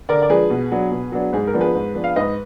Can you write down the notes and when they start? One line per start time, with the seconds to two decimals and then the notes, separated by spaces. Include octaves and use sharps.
0.09 D3 A#4 D5
0.22 D5
0.30 F3 G#3 D4 G#4 B4
0.50 B2
0.71 F#3 B3 D4
0.91 B2
1.12 F#3 B3 D4
1.33 G#2 G#4
1.47 A#4
1.54 F3 B3 D4
1.60 G#4 B4
1.75 G#2
1.95 F3 B3 D4
2.04 F5
2.16 G#2 B4 D#5